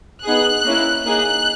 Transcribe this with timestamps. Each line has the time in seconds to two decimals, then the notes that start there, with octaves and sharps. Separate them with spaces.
0.24 B3 D#4 G#4 F#6
0.64 A#3 C#4 E4
1.05 A#3 D#4 G#4 F#6